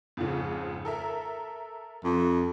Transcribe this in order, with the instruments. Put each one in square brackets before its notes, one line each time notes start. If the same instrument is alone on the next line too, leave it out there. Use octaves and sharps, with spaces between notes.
[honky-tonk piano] F2 G#2 C#3
A4 A#4 E5
[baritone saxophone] F2